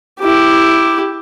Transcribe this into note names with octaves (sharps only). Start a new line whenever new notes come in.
E4 G4